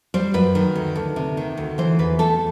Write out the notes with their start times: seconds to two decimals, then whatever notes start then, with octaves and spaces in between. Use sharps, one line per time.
0.14 G3 C5
0.34 F#2 B4
0.55 D#3
0.75 D2
0.96 D2
1.16 C3
1.37 D#3
1.57 D2
1.78 E3 C5
1.99 E2 B4
2.19 A3 A4